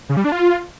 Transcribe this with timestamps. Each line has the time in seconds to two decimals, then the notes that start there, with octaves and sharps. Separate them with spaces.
0.09 C#3
0.17 G3
0.24 D4
0.32 F4